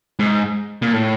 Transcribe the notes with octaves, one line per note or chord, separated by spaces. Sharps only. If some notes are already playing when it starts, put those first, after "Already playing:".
G#2
A#2
A2